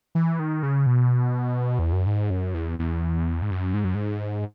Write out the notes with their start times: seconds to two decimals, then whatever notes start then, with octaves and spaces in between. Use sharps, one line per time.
0.15 E3
0.40 D#3
0.63 C#3
0.86 B2
1.79 E2
1.93 F#2
2.07 G#2
2.30 F#2
2.54 E2
2.79 E2
3.42 G#2
3.51 F#2
3.74 G#2
3.84 F#2
3.95 G#2